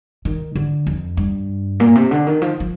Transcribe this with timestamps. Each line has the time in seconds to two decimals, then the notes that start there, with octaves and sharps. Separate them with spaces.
0.25 D#3
0.55 D3
0.87 F2
1.17 G2
1.80 A#2
1.95 C3
2.11 D3
2.27 D#3
2.42 F3
2.60 F3